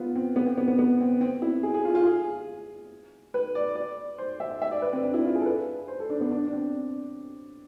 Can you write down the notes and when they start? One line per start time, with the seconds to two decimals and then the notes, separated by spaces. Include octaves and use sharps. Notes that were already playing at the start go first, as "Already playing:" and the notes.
Already playing: B3 F4
0.15 C4
0.36 B3
0.46 C4
0.58 B3
0.68 B3
0.79 B3
1.00 C4
1.21 C4
1.42 E4
1.63 G#4
1.74 G#4
1.85 F4
1.95 F4
2.06 G#4
3.34 B4
3.55 D5
3.76 D5
4.18 C5
4.40 E5
4.62 E5
4.71 D5
4.82 B4
4.93 C4
5.03 D4
5.14 E4
5.25 F4
5.35 G#4
5.41 A4
5.46 B4
5.88 C5
6.00 A4
6.10 D4
6.21 B3
6.31 D4
6.47 D4
6.53 C4